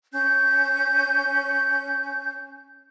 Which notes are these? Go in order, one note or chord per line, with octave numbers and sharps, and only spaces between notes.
C#4 G6